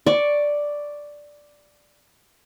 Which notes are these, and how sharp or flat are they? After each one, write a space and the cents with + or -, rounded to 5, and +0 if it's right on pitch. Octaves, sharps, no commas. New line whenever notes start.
D5 +0 C#6 +0